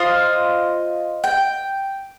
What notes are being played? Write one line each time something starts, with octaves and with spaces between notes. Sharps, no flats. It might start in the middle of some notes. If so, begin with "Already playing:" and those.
Already playing: F4 C5 D#5
G5